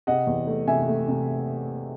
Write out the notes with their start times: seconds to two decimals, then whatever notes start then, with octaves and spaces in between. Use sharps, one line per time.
0.07 C3 D#5 F#5
0.27 E2
0.47 A3
0.67 C3 E5 G#5
0.88 A3
1.08 C3